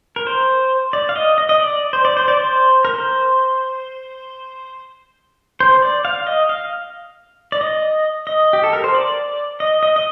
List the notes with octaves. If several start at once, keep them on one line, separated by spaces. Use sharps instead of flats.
A#4
C5
D5
F5
D#5
D#5
D#5
D5
C5
D5
C5
D5
C5
A#4
C5
C5
D5
F5
D#5
F5
D5
D#5
D#5
G4
A4
A#4
C5
D5
D#5
D#5
D#5